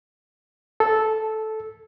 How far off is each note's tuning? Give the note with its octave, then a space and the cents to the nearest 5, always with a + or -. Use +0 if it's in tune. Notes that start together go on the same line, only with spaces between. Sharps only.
A4 -10